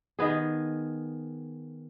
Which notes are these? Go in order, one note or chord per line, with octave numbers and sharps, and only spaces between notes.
D#3 B3 G#4